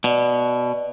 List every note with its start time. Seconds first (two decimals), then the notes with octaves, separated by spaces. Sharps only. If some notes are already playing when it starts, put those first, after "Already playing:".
0.04 B2 D5